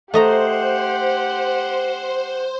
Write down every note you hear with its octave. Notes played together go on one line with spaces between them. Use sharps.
A3 G4 C5 D#5 F#5 A#5